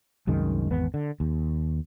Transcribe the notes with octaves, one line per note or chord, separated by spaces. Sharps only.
C2 F#2 D#3 G#3
G#1 E2 B3
D3
D#2